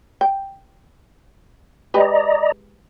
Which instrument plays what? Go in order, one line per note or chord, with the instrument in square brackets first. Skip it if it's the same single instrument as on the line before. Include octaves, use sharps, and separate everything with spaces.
[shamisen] G5
[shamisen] G#3 G4 B4 [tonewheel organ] D5 D#5 A#5